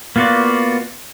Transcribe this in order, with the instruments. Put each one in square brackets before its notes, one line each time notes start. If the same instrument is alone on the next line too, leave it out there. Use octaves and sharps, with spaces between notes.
[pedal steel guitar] A#3 B3 F4 F#4 D5